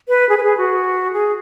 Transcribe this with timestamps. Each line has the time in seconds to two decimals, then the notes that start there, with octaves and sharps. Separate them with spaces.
0.09 B4
0.29 G#4
0.37 B4
0.43 G#4
0.58 F#4
1.13 G#4